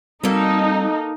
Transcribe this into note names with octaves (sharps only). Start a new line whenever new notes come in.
G3 A#3 C4 D#4 F#4 A4